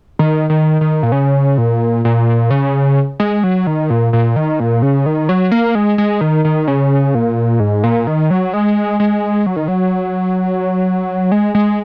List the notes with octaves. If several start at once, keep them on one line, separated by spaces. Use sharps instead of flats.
D#3
D#3
D#3
A#2
C#3
A#2
A#2
C#3
G#3
F#3
D#3
A#2
A#2
D#3
A#2
C#3
D#3
F#3
A#3
G#3
G#3
D#3
D#3
C#3
A#2
G#2
A#2
D#3
F#3
G#3
G#3
F#3
D#3
F#3
G#3
G#3